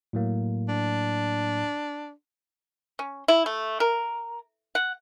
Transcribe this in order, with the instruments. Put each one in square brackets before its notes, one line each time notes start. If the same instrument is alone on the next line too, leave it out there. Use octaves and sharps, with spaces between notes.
[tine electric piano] A2 F#3 A#3
[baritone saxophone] D4
[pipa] C#4
E4
A3
A#4
F#5